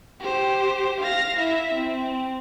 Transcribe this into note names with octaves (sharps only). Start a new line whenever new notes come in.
G4 C5
F5 A#6
E4 E5
C4